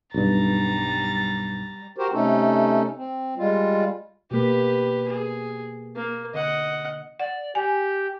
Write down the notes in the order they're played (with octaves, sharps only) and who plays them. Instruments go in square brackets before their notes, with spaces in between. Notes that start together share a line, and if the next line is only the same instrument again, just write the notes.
[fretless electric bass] B1 G2 [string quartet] G3 A#5 A6
[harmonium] F#4 G4 A#4 C5
C3 A3 C#4 D#4 A4
C4
G3 G#3 F4
[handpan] B2 A#3 [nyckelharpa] G4 B4
[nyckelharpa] G#4
A#3
[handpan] D3 [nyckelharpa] D#5 F#5
[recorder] D5 [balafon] F#5
[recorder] G4 [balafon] G#5